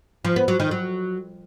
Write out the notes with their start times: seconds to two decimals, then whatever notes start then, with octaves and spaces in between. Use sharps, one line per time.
0.25 F3
0.36 B3
0.48 F#3
0.60 D#3
0.71 F#3